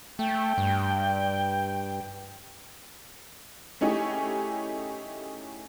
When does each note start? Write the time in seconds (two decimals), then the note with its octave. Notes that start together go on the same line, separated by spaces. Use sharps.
0.19 A3 G5
0.58 G2
3.81 A3 C#4 D#4 E4 G4 G#4